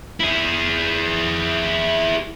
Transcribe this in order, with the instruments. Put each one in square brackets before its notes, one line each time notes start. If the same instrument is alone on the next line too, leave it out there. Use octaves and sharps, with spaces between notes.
[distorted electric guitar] E4 G#4